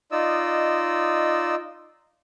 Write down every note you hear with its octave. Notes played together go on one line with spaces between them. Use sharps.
D#4 F4 D5 D#5 E6